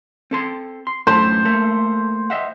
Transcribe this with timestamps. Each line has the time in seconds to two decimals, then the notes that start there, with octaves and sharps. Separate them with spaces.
0.31 C4 A4 C6
0.87 C6
1.07 F#2 A2 A3 C5
1.45 A3 A#3 A4
2.30 D#5 E5 F#5